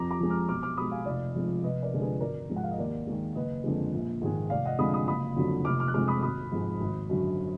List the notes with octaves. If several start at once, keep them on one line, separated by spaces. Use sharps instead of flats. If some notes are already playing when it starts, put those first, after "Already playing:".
Already playing: F2 A#5 D6
A#5 D6
F3 G#3
D6 F6
B1 D6 F6
D6 F6
B2 G#3 B5 D#6
F5 G#5
F1 D5 F5
F2 F3 G#3
F1 B4 D#5
A#4 D5
F2 D3 G#3
G#4 B4
G#1 A#4 D5
G#2 F3 G#3
F#5
F5
D#5
D#2 A#4 D5
D#3 G#3
F#1 B4 D#5
F2 D3 G#3
A#1
G#2 D#3 G#3
F1 D5 F5
D#5 F#5
F2 D3 G#3 B5 D#6
B5 D#6
F#1 B5 D#6
F2 D3 F#3
F1 D6 F6
D6 F6
F#6
F2 F3 G#3 D6 F6
B5 D#6
G#1 B5 D#6
G#2 F3 G#3
G#1
F#2 D3 F#3